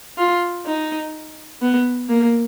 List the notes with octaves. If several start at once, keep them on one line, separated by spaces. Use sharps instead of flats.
F4
D#4
B3
A#3